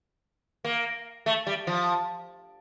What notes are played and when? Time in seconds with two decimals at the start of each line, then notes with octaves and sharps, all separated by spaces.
0.65 A#3
1.26 A3
1.47 G3
1.67 F3